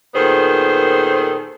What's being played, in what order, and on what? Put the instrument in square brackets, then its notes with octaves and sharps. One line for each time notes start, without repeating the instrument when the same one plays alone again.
[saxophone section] A#2 D#3 B3 G#4 A4 C5